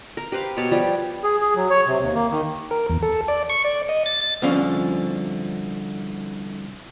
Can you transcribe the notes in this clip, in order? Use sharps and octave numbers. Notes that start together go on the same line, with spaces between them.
A#4
G4 B4 C5 F5
B2 C#5 A5
F3 G3 G4
G#4
G#4
F#3
C#5
C3
D#2
A#3
D#3
A#4
E2
A4
D5
C#6
D5
D#5
A6
A6
C2 D3 F3 C#4 F5